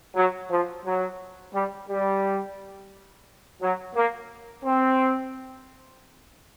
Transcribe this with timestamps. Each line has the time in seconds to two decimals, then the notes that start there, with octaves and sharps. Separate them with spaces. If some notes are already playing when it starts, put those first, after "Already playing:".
0.15 F#3
0.50 F3
0.85 F#3
1.53 G3
1.88 G3
3.61 F#3
3.95 A#3
4.64 C4